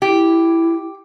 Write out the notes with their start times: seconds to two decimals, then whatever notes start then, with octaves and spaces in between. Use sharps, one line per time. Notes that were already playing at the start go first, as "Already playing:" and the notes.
0.02 E4 G4